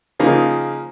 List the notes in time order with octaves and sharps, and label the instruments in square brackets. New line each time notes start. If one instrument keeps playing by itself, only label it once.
[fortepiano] C#3 F3 A#3 D#4